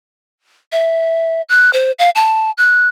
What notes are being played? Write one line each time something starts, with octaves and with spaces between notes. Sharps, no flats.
E5
F#6
C5
F5
A5
F#6